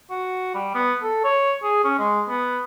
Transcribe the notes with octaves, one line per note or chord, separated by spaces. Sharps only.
F#4
G3
B3
A4
C#5
G#4
C#4
G#3
B3